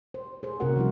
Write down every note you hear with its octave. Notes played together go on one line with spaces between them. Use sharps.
C5
G#4 C5
C3 A#3 C#4 F#4 A#4 F#5
D3 F3 G3 E4